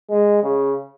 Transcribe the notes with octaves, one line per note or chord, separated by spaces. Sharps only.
G#3
C#3